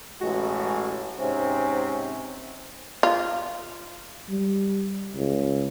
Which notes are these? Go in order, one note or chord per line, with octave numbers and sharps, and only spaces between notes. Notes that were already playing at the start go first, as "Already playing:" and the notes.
A1 G#3 F#4
G#2 C3 C4 C#4
F4
G3
C#2